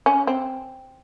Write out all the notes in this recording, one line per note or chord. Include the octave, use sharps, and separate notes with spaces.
C#4
C4